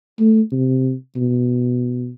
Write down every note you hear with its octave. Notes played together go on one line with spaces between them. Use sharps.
A3
C3
B2